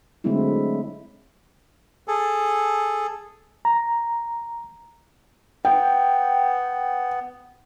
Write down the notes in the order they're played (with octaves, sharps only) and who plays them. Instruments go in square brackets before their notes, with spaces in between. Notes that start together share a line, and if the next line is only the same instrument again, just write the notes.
[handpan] D3 F#3 G#3 A3 C4 E4
[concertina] G#4 A4
[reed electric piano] A#5
[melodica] B3 [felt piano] G5